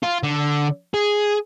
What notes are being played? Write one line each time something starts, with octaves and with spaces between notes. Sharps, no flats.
F4
D3
G#4